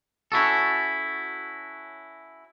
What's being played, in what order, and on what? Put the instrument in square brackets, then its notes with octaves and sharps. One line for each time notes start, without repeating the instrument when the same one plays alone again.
[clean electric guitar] C#4 E4 F#4 A4